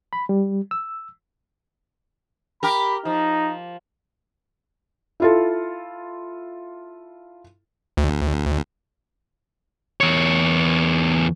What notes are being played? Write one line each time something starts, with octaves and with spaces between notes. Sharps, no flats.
B5
G3
E6
G4 A#4 B5
F3 D#4
E4 F4 A4
D2
E2 C#5